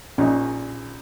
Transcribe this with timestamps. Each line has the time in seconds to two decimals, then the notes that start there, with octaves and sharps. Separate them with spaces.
0.18 A#1 A#2 C#4 D#4